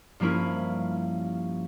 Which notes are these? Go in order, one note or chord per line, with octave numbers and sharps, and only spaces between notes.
G2 F3 A#3 C#4 E4